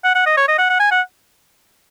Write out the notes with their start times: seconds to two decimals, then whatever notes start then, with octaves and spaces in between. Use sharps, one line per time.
0.04 F#5
0.15 F#5
0.26 D#5
0.37 C#5
0.48 D#5
0.58 F#5
0.70 F#5
0.80 G#5
0.91 F#5